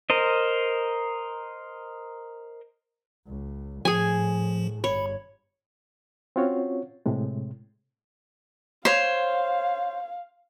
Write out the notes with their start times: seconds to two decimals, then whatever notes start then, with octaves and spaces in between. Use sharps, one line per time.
0.10 A#4 C5 D#5
3.27 C#2
3.85 A2 F3 G#4 G#5
4.84 G1 C#5 B5
6.36 C4 C#4 F4 F#4 C#5
7.06 A2 C3 G#3
8.85 C5 C#5 F5